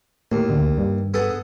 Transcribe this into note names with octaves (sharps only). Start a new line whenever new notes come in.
D#2 A2
D2
G2
B3 G#4 A4